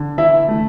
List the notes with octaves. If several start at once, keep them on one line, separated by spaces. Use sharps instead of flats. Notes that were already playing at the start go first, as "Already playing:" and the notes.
Already playing: D3
E3 E4 E5
A3